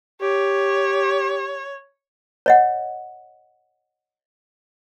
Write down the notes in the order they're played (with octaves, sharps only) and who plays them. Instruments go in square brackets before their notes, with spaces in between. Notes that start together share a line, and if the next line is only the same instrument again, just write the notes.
[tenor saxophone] G4 [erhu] C#5
[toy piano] C#5 D#5 F#5